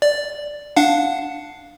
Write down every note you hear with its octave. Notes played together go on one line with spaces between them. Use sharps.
D5
D4 F5 F#5